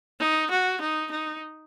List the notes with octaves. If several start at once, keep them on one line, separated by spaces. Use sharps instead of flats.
D#4
F#4
D#4
D#4